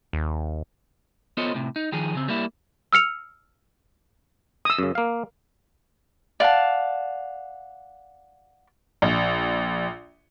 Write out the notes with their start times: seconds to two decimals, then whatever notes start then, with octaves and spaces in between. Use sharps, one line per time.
0.13 D#2
1.37 B3 F4 A4 C5 C#5 D#5
1.54 A2 C3
1.76 D#4
1.92 D#3 F3 G#4
2.15 C#3 C4
2.28 G3 A#3 E4
2.93 E6 F6 C#7 F7
4.65 D#6 E6
4.79 F#2 C#3
4.95 A#3 F5
6.40 D5 F5 F#5 A5
9.02 A#1